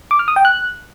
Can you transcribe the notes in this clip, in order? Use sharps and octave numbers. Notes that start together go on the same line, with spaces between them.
D6
F6
D#6
G5
F#6